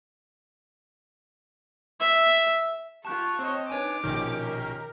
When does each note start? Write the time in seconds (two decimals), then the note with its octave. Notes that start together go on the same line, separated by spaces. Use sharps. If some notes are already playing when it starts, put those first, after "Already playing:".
2.01 E5
3.05 F4 G4 A5 C#6 F#6
3.39 C4 C#5 D#5
3.70 D4 D#4 B4 C#5 G#5 D6
4.04 A#1 B2 D#3 C#4 G4 F6
4.44 A#4